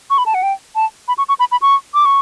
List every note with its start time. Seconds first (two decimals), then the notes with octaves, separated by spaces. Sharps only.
0.10 C#6
0.18 B5
0.26 A5
0.34 F#5
0.43 G5
0.75 A5
1.08 B5
1.18 C#6
1.29 C#6
1.40 B5
1.52 B5
1.62 C#6
1.94 D6
2.05 C#6